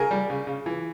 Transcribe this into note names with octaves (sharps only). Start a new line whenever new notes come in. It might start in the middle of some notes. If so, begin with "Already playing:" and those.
Already playing: C#3 G#4 A#4
G3
C#3
C#3
E3